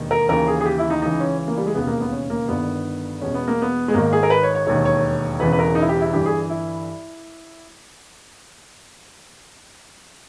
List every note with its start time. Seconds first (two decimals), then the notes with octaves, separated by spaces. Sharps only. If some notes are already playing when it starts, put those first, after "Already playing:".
Already playing: E1 D#2 D#3
0.11 A#4
0.29 D#2 C#3 E3 A#4
0.47 G#4
0.61 G#4
0.66 G4
0.78 E4
0.90 D#4
1.02 C#2 C#3 E3 D#4
1.20 C#4
1.38 C#4
1.48 A#3
1.57 G3
1.66 G#3
1.75 E1 D#2 C#3 B3
1.87 A#3
2.00 B3
2.12 C#4
2.30 A#3
2.48 G1 G2 D#3 B3
3.21 E1 E2 B2 C#4
3.34 B3
3.48 A#3
3.62 B3
3.88 G#3
3.94 G#1 G#2 D#3 A#3
4.13 G#4
4.23 A#4
4.30 B4
4.43 C#5
4.55 C#5
4.67 E1 D#2 D#3 C#5
4.85 C#5
5.40 E1 E2 C#3 E3 B4
5.53 B4
5.59 A#4
5.75 D#4
5.81 E4
5.89 G4
6.01 E4
6.12 G1 G2 E3 G4
6.26 G#4
6.49 E4